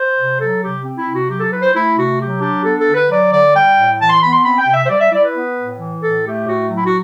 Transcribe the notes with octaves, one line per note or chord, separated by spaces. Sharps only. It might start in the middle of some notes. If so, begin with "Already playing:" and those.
Already playing: C5
C3
F#3 A4
C3 G4
C4
E4
C3
F#4
F#3 G4
A4
E4 B4
C5
A3 E4
C3 F#4
F#3 G4
D4 G4
B3 A4
A4
D3
B4
F#3 D5
D3 D5
G3 G5
A2
E3 A5
C6
B3 B5
C6
C4 B5
G5
C3
E5
C5
G3 D5
E5
E4 D5
B4
B3
A2
E3
A2 A4
A3 G4
A2 F#4
F#3
E4
F#4